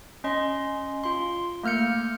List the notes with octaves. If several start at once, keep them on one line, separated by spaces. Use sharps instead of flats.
C#4 D#5 C6
F4 C6
A3 A#3 F6 G6 C#7